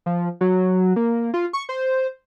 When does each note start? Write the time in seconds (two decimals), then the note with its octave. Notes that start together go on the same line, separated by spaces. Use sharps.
0.06 F3
0.41 F#3
0.96 A#3
1.34 F4
1.53 C#6
1.69 C5